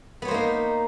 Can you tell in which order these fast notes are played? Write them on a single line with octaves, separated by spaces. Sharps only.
B3 C#5 C5 A#3 D#4